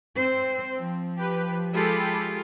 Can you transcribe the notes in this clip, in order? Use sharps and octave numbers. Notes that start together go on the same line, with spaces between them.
C4 C5
F3
G4 B4
G#3 F4 G4 A4 B5